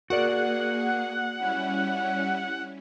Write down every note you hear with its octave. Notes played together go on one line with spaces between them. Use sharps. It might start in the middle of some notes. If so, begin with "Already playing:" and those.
A#3 F#4 G#4 A#4 D5 F#5
G3 C#4 E4